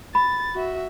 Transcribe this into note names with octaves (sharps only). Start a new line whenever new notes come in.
B5 A6
F#4 E5